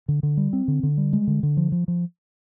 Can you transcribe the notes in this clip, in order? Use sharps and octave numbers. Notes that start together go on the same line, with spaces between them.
D3
D3
G3
C4
D3
D3
G3
G#3
D3
D3
F3
F3
F3